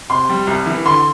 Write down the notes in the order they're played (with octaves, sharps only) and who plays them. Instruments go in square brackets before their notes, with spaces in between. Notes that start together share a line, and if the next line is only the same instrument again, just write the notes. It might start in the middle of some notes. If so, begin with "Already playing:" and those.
[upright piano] C3 C6
G3
C2
E3
D3 C6